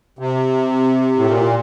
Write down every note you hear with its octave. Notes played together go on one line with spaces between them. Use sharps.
C3
A2
A#2